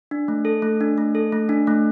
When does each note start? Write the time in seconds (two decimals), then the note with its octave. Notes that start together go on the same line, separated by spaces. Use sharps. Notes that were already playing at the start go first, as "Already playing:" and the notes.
0.11 D4
0.28 A3
0.45 A4
0.62 A3
0.81 D4
0.98 A3
1.15 A4
1.32 A3
1.49 D4
1.67 A3